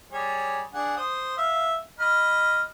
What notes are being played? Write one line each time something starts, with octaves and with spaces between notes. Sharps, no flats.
G3 G#4 C#5
D4 G#4 F#5
C5 D#6
E5 F5
D#5 B5 F6